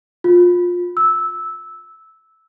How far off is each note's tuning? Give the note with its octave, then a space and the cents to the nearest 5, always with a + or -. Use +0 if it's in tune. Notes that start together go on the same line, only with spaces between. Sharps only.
F4 +20
E6 -10